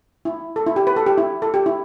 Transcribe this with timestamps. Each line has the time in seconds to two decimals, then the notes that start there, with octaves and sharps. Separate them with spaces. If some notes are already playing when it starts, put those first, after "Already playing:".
0.25 E4
0.56 A4
0.66 E4
0.76 G4
0.87 B4
0.96 A4
1.06 G4
1.18 E4
1.42 A4
1.54 G4
1.66 E4